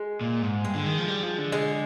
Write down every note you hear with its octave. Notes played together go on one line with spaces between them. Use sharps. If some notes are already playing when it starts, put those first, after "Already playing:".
Already playing: G#3
A#2
G#2
G2 G#3
D3
D#3
F3
G3
F3
D3
G#3